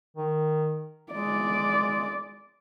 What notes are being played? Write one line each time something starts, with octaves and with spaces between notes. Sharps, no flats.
D#3
G#3 D5